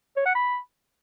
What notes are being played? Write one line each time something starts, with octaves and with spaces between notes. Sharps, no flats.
C#5
F#5
B5